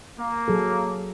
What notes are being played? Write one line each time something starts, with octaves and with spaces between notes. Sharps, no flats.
A#3
F#3 G#4 A4